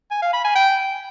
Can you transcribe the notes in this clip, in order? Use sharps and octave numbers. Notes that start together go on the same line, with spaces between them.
G#5
F5
B5
G#5
G5